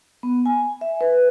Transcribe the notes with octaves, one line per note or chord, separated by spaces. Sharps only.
B3
G#5
E5
B4